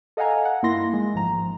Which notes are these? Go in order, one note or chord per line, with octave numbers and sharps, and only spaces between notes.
A4 D#5 F5 F#5 G#5 A#5
F#5
G2 A#3 D#4 E4 C6 A#6
G#3
A1 G#2 F3 A#5